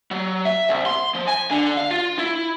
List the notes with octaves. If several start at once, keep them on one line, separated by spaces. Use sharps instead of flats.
F#3
E5
C2
C6
F3
G#5
D3
F5
F4
E4